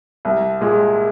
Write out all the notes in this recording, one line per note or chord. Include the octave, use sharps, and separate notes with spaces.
C2
A#2 G#3